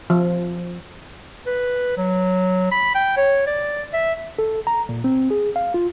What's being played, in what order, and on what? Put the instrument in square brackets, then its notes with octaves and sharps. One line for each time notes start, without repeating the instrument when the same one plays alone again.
[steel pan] F3
[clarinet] B4
F#3
B5
G5
C#5
D5
E5
[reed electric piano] A4
A#5
A#2
C4
G#4
F5
F4